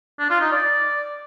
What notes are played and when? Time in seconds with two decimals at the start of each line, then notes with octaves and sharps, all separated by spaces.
0.19 D4
0.30 F4
0.41 D#4
0.52 D5